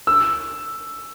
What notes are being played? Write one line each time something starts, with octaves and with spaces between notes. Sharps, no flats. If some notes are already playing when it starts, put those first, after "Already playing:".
E6